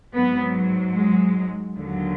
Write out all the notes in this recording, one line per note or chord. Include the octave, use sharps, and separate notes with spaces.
G#2 F#3 B3
G#3
D#2 D3 F#3